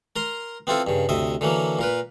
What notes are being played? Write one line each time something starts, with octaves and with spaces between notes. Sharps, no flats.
A#4 A#5 C6
B3 C4 E4 F4 A4
G2 C#3
D2 C3 D#5 E5
D3 E3 F#3 A#3
A#2 A#4 B4